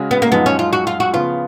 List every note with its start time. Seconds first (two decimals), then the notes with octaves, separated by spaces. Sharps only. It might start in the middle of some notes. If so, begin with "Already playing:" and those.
Already playing: C#3 G#3 C#4 F#4
0.11 B3
0.22 A#3
0.32 F#2 F3 G#3 B3 D#4
0.46 C#4
0.59 F4
0.73 F#4
0.87 F4
1.00 F#4
1.13 C#3 F3 B3 F4